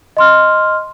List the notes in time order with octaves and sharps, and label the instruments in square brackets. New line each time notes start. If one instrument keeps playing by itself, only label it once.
[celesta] D#5 C6 F6